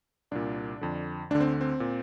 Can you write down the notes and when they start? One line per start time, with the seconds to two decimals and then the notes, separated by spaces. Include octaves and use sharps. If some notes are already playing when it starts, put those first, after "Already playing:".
0.31 C2 A#2 D4
0.81 F2 D3
1.30 D2 D3 D4
1.40 C4
1.61 C4
1.80 A#2